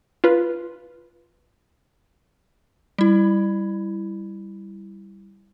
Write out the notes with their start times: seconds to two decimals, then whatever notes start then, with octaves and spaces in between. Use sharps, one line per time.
0.24 F4 B4
2.98 G3 E4